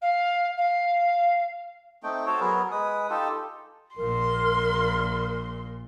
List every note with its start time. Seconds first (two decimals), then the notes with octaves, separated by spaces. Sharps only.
0.01 F5
0.57 F5
2.03 A3 C4 D#4 G5
2.26 F#4 A4 C5 C#5
2.40 F#3 B3 G#4 A#4
2.71 G#3 B4 D#6
3.10 D#4 F4 G4 A4
3.96 A#1 A#2 A#4 C6